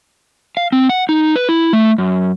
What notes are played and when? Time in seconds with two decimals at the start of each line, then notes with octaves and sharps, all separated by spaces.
0.57 F5
0.72 C4
0.89 F#5
1.09 D#4
1.36 B4
1.49 E4
1.73 A3
1.98 F#2